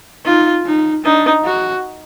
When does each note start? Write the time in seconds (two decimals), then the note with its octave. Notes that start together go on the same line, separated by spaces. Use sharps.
0.25 D#4 F4
0.65 D#4
1.04 D4 D#4
1.44 F#4